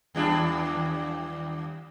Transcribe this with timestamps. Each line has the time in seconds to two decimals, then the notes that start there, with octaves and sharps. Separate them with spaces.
0.15 D#2 G3 D4